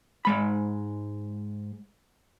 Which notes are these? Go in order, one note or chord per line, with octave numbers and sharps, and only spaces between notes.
G#2 G#3 B5